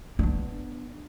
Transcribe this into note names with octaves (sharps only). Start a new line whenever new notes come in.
B3 D4